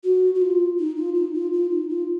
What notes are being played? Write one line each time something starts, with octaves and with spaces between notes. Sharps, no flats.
F#4
F#4
F4
D#4
F4
D#4
F4
F4
D#4
F4